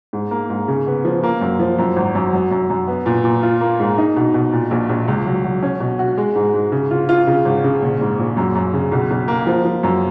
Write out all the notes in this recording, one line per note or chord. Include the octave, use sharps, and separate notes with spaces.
G#2
A#3
G#2
C#3
B3
F3
A#3
F#2
F3
F#2
G#1
F#2
F#3
F#2
F#2
B3
A#2
A#2
F4
A#3
G#2
D#4
B2
B2
A#2
A#1
A#1
C#2
F#3
F#3
C#4
B2
F#4
G#3
G#2
G#2
C#3
F4
F4
C#3
G#1
C#3
A#1
G#2
A#1
F#2
F#2
C#3
B1
B1
A#3
F3
F3
F#2